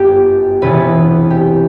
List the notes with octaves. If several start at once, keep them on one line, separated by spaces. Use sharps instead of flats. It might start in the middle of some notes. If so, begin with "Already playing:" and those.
Already playing: G1 F#2 F#3 B3 G4
E1 E2 C3 E3 B3 B4
G4